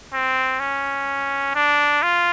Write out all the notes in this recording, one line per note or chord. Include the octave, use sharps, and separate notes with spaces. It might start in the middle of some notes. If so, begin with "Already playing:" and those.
C4
C#4
D4
F4